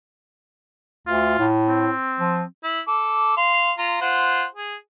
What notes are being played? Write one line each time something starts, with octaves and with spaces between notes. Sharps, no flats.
D2 F4
A2
C4
F3
E4
A4 D6
F5 C6
F4 A#5
F4 C5 F#5
G#4